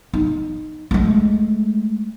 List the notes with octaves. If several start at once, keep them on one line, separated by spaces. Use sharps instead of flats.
D#4
G#3 A3